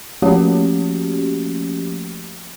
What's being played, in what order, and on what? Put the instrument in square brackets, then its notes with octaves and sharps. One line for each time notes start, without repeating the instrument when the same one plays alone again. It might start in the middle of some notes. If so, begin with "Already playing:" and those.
[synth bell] F3 A3 A#3 C#4 F#4 G4